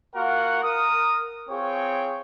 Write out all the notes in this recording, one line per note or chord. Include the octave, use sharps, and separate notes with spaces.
A#3 F4 F#4 A#4 F#5
A#4 D#6
C4 F4 G#4 C#5 G5 C#6